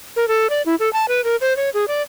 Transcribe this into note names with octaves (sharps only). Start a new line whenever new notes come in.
A#4
A4
D5
E4
A4
A5
B4
A#4
C5
C#5
G#4
D5